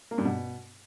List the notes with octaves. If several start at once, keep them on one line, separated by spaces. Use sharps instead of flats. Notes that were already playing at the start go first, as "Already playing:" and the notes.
A#3
G2
B2